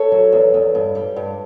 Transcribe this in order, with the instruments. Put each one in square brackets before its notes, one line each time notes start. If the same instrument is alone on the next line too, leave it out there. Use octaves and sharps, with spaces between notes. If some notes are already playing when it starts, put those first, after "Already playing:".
Already playing: [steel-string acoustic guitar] A4 C#5
F#3
E2
E2
G2
G3
G2